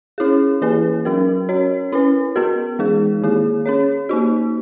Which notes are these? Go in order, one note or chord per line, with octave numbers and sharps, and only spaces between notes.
C#4 E4 G#4
E3 A#3 E4 G#4 B4
F#3 C#4 F#4 A#4
C#4 F#4 A#4 C#5
C#4 E4 B4
B3 F#4 A#4
E3 G#3 D#4 G#4
D#3 A#3 E4 G#4
C#4 G#4 C#5
A#3 D#4 F#4